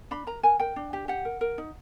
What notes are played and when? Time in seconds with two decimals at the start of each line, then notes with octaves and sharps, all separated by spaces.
0.11 D4 B5
0.27 A#4 A#5
0.43 A#4 G#5
0.59 A#4 G5
0.76 D4
0.93 G4
1.08 G4 F#5
1.25 A#4
1.41 A#4
1.58 D#4